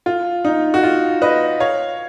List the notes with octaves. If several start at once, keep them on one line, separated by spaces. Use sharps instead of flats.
F4
D#4
F#4
F4
B4 D#5
C#5 F5